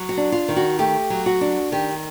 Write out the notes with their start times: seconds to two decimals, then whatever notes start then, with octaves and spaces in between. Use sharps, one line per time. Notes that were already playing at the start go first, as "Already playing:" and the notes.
Already playing: F#3
0.09 F#4
0.17 D4
0.32 F4
0.48 D#3
0.56 F#4
0.79 A3 G4
1.10 F#3
1.26 F#4
1.41 D4
1.72 D#3 G4